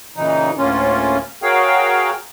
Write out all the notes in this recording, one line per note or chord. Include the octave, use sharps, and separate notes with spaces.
A#2 C#3 E3 D#4
D2 A2 A#3 C#4 F4
F#4 G#4 A#4 C#5 F5 G5